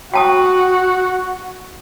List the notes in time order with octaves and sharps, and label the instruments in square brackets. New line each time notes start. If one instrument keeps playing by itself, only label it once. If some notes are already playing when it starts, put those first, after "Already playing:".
[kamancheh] F#4 [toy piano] G5 A5 D#6